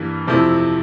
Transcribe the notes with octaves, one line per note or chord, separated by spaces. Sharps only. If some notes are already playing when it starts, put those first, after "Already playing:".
Already playing: G2 E3 G3 A#3
F2 C3 F3 A3 E4